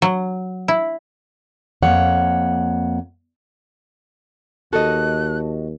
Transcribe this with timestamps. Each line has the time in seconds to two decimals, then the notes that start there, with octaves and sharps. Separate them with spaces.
0.02 F#3
0.68 E4
1.82 F2 A#3 C#5 F#5
4.73 D#2 F#4 A4 D#5 F#6